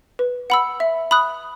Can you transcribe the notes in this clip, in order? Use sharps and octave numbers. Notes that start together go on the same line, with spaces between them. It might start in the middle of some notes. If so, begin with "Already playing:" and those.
B4
F#5 B5 E6
E5
B5 D#6 F#6